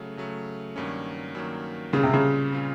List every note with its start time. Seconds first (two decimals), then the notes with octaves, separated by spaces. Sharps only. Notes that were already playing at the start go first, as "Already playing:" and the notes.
Already playing: C#3 F#3 A3
0.17 C#3 F#3 A3
0.76 G2 D#3 F#3 A#3 C#4
1.34 G2 D#3 F#3 A#3 C#4
1.93 A#2 C#3 G3 C4 F4
2.03 C3
2.14 C#3
2.52 A#2 G3 C4 F4